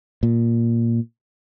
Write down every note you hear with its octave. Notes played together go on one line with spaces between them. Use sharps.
A#2